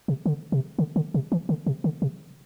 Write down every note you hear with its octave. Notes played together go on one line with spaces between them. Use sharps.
C3
D3
C3
D3
D3
C3
E3
D3
C3
D3
C3